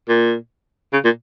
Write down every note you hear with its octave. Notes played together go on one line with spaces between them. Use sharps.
A#2
C#3
A#2